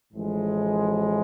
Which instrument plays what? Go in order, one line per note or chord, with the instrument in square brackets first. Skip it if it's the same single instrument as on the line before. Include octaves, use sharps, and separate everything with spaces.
[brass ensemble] A1 A2 F3 G#3